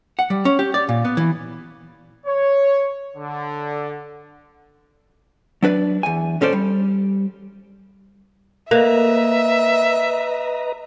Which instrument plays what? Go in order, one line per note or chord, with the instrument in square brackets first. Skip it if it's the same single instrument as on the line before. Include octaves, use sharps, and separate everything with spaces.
[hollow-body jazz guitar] F#5
G3
C#4
G4
D5
A#2
B3
E3
[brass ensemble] C#5
D3
[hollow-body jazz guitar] F#3 D4 B4 D5
E2 G#5
A#2 C#4 A4 C5 D5
G3
[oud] A#3 [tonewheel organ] B4 D#5 A#5 [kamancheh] E5